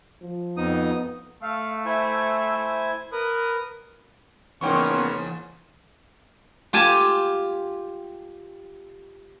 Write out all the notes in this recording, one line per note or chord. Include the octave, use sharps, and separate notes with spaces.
F3
F2 B3 D#4 D#6
A3 F5
E4 C5 G#5
A#4 B4 D#6
E2 G#2 C#3 A#3 B3 C#4 G5 C#6
F4 G4 G#5 A5